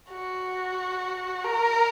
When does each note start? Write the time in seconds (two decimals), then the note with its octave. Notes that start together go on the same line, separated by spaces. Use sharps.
0.10 F#4
1.45 A#4